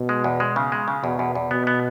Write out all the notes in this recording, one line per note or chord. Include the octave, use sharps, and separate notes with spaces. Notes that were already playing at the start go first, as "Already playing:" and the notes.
Already playing: B2
G#3
E2
G#3
C#3
G#3
C#3
E2 B2
E2
E2
B2 B3
B3